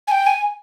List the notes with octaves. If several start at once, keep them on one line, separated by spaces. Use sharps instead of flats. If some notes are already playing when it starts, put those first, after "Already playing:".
G#5
G5
G#5